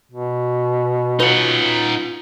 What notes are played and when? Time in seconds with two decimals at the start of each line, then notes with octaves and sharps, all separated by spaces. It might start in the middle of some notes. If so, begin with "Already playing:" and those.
0.11 B2
1.20 C#4 D#4 F4 B4 F#5